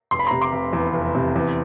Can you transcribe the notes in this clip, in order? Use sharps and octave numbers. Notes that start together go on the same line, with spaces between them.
F1 C6
B5
C3 A#5 C6
C6 D6
F1
E2
F1
C3
E2